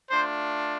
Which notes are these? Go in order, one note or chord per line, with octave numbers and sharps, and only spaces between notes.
A3 D4 F4 C5